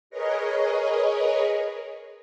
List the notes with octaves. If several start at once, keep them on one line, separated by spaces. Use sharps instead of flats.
G#4 A#4 B4 C#5 D#5